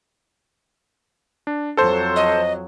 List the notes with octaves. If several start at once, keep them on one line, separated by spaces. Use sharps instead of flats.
D4
F2 F#3 A4 C5
D#5